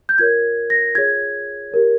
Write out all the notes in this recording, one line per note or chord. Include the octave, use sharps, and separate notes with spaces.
G6
F4 A#4 C#5 G#6
A#6
F4 G#4 C#5 G#6
G4 A#4 C#5